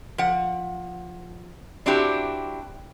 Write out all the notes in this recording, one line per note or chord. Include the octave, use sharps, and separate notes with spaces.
F3 F#5
C4 D4 E4 F#4 G4